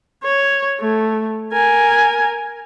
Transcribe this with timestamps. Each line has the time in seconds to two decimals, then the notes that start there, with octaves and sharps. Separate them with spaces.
0.24 C#5
0.80 A3
1.53 A#4 G#5